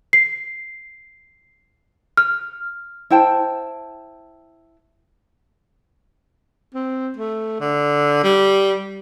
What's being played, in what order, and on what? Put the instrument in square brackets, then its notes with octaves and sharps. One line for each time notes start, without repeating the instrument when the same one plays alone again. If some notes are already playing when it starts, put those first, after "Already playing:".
[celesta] C7
F6
[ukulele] E4 C5 G5 A5
[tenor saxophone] C4
A3
D3
G3